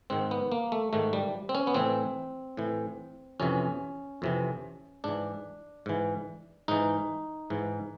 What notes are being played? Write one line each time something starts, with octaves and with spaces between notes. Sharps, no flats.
G#2 D#3 C4
B3
A#3
A3
G#2 D#3 A3
G3
C4
C#4
B3
A2 E3 C4
A2 E3
F2 C3 E3 C#4
F2 C3 E3
G#2 E3 D4
G#2 E3
G#2 E3 D#4
G#2 E3